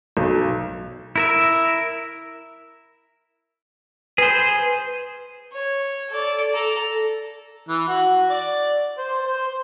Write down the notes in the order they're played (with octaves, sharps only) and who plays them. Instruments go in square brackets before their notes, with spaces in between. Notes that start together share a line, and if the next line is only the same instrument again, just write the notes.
[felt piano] B1
[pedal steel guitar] E4 A#4 E5
[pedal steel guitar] G#4 C5 [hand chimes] B4
[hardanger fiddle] C#5
A4 D5
A4 A#5
[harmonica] E3
F#4
D5
C5
C5